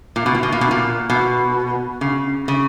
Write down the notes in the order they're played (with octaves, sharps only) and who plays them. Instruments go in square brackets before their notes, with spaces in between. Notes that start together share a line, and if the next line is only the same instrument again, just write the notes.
[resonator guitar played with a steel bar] A#2
B2
A#2
B2
A#2
B2
A#2
B2
C#3
C#3